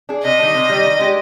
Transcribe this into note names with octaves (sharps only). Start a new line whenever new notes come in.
D4 G#4
C3 D#5
D#3 G3 D4
C3
D#3 G3 D4
D#3
G#3 D4 G4